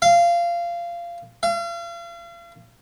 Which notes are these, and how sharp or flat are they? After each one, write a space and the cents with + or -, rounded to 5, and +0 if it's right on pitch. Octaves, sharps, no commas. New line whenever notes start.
F5 -20
F5 -40